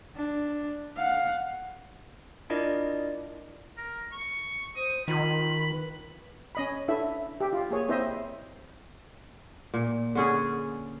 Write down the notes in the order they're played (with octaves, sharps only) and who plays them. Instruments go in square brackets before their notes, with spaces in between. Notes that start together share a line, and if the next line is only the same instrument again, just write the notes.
[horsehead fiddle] D4
F5 F#5
[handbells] D4 E4 F4 A#4 D5 D#5
[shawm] A#4
C#6
[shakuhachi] C5 [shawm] D#6
[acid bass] D#3 [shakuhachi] F4 [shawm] B5
[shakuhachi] B4
[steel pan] C#4 D#5 B5
D4 E4 A4 E5
G4 E5
F4
A#3 G#4 C#5
C4 E4 C5 D#5 E5
[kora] A#2
D3 C#4 G#4